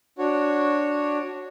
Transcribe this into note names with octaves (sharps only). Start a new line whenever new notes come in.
D4 F#4 C#5